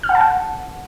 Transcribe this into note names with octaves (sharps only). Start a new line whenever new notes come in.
F6
F#5
A5
F#5